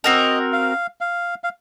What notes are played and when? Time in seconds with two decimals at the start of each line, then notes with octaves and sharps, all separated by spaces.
0.04 C4 F#4 A#4 D#5
0.53 F5
1.01 F5
1.44 F5